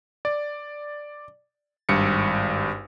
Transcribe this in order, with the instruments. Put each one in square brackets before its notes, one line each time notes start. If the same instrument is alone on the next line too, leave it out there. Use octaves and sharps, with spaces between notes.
[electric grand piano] D5
G#1 G2 C#7